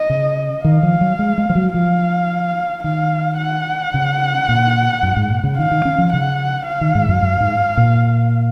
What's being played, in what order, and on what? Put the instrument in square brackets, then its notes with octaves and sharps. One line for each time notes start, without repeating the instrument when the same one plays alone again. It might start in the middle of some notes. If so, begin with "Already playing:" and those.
Already playing: [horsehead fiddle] D#5
[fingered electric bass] C#3
[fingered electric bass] D#3 [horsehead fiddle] F5
[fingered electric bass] F3
F#3
G#3
G#3
F3
F#3
[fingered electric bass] F3 [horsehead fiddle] F5
[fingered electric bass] D#3 [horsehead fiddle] F5
[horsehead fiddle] F#5
[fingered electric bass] C#3
A#2
F#2
G#2
A#2
C#3
[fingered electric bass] D#3 [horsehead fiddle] F5
[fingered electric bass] D#3
C#4
F3
[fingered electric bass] C#3 [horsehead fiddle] F#5
[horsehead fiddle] F5
[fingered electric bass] D#3
G#2
F#2
F#2
G#2
A#2